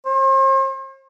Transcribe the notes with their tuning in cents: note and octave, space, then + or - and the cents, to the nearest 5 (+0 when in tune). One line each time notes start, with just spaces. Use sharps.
C5 +45